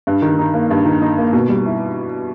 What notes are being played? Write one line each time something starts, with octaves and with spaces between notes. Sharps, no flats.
G2
D#3
D#4
A#3
G2
D#3
D#4
A#3
B2
G3
E4